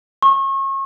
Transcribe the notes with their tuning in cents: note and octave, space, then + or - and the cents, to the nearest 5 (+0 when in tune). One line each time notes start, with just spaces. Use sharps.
C#6 -35